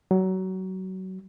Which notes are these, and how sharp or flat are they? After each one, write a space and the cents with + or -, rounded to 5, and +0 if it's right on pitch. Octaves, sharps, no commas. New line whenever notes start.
F#3 +25